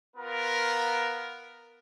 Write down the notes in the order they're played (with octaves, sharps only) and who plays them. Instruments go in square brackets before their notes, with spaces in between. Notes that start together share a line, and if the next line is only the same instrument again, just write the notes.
[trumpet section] B3 F4 A#4